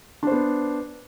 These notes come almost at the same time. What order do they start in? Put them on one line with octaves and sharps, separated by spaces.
D4 C5 B3